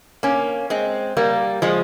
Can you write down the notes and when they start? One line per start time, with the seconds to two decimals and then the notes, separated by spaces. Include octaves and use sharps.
0.23 A#3 C#4
0.70 G#3 C4
1.17 G3 A#3
1.62 F3 G#3